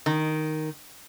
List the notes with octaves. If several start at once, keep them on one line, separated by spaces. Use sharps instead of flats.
D#3